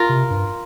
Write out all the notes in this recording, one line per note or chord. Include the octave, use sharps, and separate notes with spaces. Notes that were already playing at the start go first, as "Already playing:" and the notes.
Already playing: F4 A#4
C3
G2